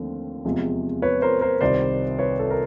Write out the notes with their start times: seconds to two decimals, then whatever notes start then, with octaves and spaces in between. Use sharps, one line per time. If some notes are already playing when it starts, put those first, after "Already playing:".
Already playing: D#2 D3 F3 A3 C4
0.45 E2 C3 F3 G#3
1.02 B4 C#5
1.22 A#4 C5
1.41 A#4 C5
1.61 C2 C3 D#3 G3 C5 D5
2.19 B4 C#5
2.39 A4
2.50 A#4